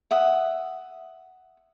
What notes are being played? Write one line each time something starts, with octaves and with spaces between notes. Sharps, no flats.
E5 F#5 D#6